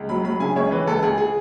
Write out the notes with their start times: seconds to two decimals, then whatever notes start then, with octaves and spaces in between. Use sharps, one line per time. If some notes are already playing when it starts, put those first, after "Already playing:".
Already playing: C#2
0.09 F#3 B5
0.24 F#3 B5
0.40 C#3 G#5
0.56 C#2 C#5
0.71 E3 B4
0.87 C#2 A4
1.03 C#2 G#4
1.18 G#4